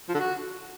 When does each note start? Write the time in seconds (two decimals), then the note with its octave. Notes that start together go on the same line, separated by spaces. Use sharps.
0.09 F3
0.14 D3
0.20 F#4